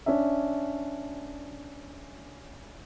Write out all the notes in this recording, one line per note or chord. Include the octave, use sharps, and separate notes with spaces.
C#4 D4 D5 E5